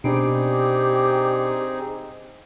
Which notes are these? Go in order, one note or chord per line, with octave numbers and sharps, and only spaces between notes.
B2 C4 D4 D#4 G4 G#4 D5